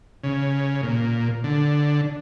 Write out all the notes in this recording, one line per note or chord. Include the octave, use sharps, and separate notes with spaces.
C#3
A#2
D3